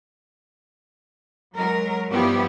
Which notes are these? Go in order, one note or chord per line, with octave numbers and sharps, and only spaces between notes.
F#3 G#3 A#4
G2 F3 G3 B3 E4 G4